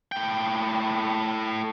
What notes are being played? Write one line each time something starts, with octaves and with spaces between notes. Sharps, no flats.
A2 G5